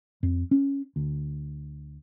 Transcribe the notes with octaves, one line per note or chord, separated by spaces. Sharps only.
F2
C#4
D2